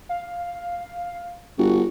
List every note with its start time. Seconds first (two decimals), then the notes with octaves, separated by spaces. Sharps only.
0.09 F5
1.58 G1 F#4